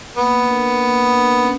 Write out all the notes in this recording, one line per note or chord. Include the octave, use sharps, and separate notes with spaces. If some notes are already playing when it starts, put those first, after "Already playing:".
A#3 B3
D4 A#4
A#3
D4 A#4
C#4